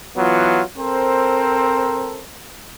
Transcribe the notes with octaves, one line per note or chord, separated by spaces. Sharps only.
E3 F#3 B3 F4
C4 A4 A#4 C5